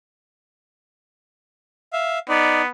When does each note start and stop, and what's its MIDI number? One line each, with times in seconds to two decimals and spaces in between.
1.93 2.19 76
1.93 2.19 77
2.29 2.69 59
2.29 2.62 63
2.29 2.62 74